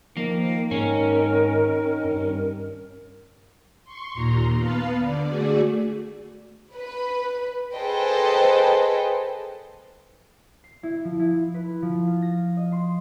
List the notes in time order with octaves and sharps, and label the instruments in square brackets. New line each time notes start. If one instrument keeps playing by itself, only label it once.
[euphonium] D#3 [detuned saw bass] F3 [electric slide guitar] A#3
[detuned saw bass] G#2 [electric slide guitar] C#4 [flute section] A#4
[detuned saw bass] G2
[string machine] C6 C#6
D#2 A#2 A#5 C6
B3 B4 F5 A5
D3 D5
A3 F#4 G#4 D5
[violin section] B4
G#4 A4 B4 C5 D#5 G5
[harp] C7
E4
F3
E4
B4
F3
F4
A#6
D#5
C6